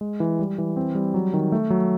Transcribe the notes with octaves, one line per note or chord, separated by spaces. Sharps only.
G#3
E3
G3
E3
C4
G3
F#3
D#3
A3
F#3